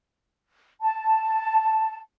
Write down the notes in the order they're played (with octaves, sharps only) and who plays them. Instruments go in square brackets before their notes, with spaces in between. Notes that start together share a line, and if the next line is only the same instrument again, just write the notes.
[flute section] A5